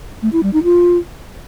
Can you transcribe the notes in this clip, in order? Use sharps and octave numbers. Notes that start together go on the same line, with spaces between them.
A3
E4
G3
D#4
F4